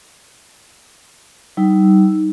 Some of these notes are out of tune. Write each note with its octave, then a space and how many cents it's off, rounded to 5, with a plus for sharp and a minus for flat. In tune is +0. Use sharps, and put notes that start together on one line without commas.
G3 -35 D#4 +5 E6 +0